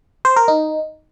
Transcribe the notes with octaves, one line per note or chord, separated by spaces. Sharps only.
C5
A#4
D#4